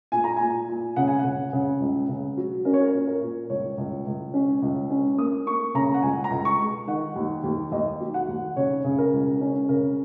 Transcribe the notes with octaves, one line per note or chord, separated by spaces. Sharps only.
A#2 G#5
A#5
A#2 G#5
A#2
C#3 F#5
G#5
C#3 F#5
C#3
C#2
C#3
F#3
C#4 A#4
C#5
A#4
A#2
A#4
A#2
C#2 C#5
C#2
C#2
C#4
C#2
C#4
A#3 D#6
A#3 C#6
C#3 A#5
F#5
C#2 G#5
A#5
C#2
C#6
G#3
D#3 F#5
D#2
D#2
D#2 D#5
F#3
F#5
D#2
C#3 C#5
C#3
A#4
C#2
C#4
C#3 A#4